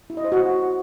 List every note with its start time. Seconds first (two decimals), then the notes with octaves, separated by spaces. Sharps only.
0.10 E4
0.17 D#5
0.24 C5
0.32 F#4